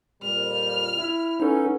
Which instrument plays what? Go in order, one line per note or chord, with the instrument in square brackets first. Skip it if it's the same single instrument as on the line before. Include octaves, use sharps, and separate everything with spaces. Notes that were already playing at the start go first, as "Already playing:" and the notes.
[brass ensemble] F2 A#2 G3 [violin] F6
[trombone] E4
[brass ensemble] B3 C#4 [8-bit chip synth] D#4 A4